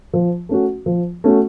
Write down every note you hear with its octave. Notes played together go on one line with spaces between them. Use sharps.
F3
A3 C#4 F#4
F3
A3 C#4 F#4